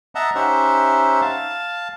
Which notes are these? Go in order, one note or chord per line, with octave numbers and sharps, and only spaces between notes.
D#5 E5 F#5 A5 A#5
C#4 D#4 G4 C5 E5 F#5
F5 A5